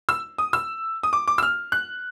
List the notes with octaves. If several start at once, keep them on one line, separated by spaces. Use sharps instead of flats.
E6
D#6
E6
D#6
D6
D6
E6
F6
F#6